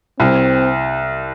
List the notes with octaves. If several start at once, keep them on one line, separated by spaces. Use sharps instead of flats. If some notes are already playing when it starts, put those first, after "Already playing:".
C2 C4